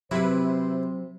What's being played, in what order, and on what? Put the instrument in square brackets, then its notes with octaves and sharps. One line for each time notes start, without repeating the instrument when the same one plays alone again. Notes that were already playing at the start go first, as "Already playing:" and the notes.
[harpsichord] C3 [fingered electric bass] F#3 [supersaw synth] E4 B4 [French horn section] C5